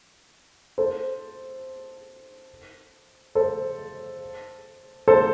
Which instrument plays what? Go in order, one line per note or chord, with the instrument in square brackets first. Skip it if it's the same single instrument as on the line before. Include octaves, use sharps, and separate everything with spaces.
[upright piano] A4 C5
A4 C5
A4 C5